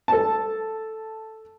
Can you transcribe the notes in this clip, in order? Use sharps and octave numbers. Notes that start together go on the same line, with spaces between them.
A4 A5